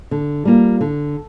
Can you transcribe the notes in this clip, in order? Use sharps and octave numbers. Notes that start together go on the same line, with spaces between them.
D3
G3 A#3 F4
D3